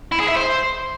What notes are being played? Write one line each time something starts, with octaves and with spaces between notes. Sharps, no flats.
E4
G#4
E5
C5